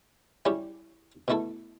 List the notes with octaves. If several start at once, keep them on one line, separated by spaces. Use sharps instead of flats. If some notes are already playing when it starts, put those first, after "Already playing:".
G3 C#4 E4 G4
B2 A3 E4 A4